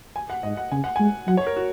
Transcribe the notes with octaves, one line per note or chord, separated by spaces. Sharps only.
G#5
F#5
G#2 D#5
F#5
C#3 G#5
F#5
G#3 G#5
F#3 F#5
C#5
A#4
F#4